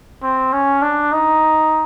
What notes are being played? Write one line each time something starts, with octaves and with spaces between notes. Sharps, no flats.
C4
C#4
D4
D#4